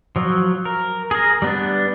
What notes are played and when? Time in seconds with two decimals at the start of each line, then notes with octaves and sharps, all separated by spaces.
0.16 F3 F#3
0.65 A#4
1.11 G#4 A#4
1.42 G3 B3 D4